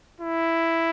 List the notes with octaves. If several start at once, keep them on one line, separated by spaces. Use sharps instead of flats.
E4